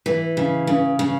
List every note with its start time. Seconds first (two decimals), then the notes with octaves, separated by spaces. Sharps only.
0.06 E3
0.37 C#3
0.67 C#3
0.99 C#3